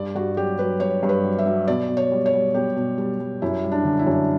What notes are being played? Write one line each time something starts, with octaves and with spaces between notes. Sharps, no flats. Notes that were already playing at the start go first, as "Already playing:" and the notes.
Already playing: G2 D5
G2 F#4
F#3 G4
F#3 B4
G2 C#5
G2
B4
F#3
E5
F#3
B2 D5
B2
C#5
G3
C#5
G3
B2 G4
B2
G3
G3
F#2 E4
G3
D4
D3
E4
F#2